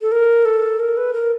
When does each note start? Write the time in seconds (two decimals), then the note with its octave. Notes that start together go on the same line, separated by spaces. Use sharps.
0.02 A4
0.12 A#4
0.45 A4
0.79 A#4
0.97 B4
1.14 A#4